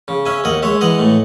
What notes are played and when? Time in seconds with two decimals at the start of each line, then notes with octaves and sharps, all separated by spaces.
0.08 C#3
0.26 C#4 E5 G#5
0.44 D#2 D#5 F#5
0.62 G#3 C#5 E5
0.81 E3 D#5 F#5
0.99 A2